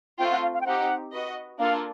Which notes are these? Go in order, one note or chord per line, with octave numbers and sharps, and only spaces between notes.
A3 C4 F4 G5
F#5
F5
F5
G5
C4 D#4 G4 F#5
F#4 B4 D#5
A#3 D4 F4 A4 F5